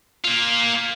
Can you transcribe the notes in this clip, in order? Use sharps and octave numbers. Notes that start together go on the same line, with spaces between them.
A#3 F4